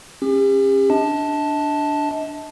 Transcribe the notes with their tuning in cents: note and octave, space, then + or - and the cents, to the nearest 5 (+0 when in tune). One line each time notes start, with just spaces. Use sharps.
C#4 -30 G4 +40
D4 +0 D#5 +40 A5 +0